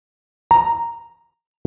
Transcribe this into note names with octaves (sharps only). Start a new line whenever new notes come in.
A#5